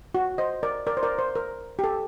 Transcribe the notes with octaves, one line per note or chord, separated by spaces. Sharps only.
F#4
C5 D#5
A#4 D5
A#4 D5
C5
A#4 D5
C5
A#4
G4
A4